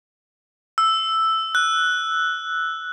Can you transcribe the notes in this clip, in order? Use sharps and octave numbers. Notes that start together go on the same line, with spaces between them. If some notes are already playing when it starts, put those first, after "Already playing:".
E6
F#6